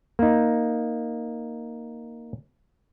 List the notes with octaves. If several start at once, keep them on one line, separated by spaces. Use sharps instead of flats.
A#3 D#4